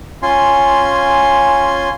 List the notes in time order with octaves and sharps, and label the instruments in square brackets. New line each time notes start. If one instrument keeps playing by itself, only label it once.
[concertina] C#4 F4 G#5 C6